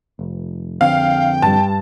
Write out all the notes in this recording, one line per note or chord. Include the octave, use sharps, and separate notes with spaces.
F1
F2 D3 C4 F5 G5
G2 A5